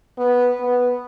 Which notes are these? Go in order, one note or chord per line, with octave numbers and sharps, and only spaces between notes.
B3
B3